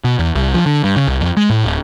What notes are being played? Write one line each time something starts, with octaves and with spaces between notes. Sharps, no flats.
B2
E2
C2
F3
D3
G2
C#3
C2
F2
G#3
A2
D1